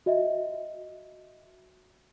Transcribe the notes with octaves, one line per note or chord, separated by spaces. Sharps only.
F#4 D#5 E5